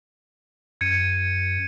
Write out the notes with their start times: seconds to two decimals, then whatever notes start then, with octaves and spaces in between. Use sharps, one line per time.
0.81 F#2 G#6 C#7 D#7